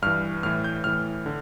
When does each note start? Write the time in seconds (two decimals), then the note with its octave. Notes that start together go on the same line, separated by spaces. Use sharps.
0.02 G2 E3 F6
0.43 A2 E3 F6
0.64 G6
0.84 A2 E3 F6
1.26 D3